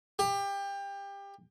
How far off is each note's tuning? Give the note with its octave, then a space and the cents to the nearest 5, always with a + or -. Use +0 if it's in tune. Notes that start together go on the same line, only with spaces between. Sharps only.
G4 +25